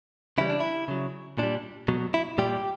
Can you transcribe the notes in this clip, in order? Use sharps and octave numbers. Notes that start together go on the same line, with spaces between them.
C#3 E3 G3 E4
D4
E4
C#3 F#3
A#2 G3 D4
B2 F#3
E4
A#2 G3 G4